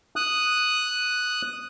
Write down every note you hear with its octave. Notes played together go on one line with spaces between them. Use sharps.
D#6 F#6